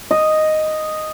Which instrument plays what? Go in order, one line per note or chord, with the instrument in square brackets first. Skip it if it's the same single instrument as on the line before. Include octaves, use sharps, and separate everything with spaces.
[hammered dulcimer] D#5